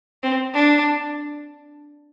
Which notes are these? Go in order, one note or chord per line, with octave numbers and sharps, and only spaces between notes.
C4
D4